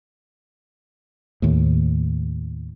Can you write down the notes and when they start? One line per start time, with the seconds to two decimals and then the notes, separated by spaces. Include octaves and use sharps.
1.42 D#2 A2